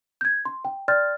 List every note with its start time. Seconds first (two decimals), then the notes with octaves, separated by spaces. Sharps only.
0.21 G6 G#6
0.45 C6
0.65 G5
0.88 D5 G5 C6 F6 G6 A6